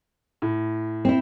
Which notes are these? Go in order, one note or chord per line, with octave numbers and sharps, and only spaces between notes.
A2
C4 E4